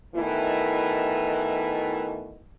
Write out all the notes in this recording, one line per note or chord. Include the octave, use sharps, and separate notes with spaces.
B2 D#3 E3 A3 E4